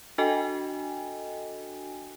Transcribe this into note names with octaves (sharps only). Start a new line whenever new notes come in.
D4 F#4 A4 D#5 G5 G#5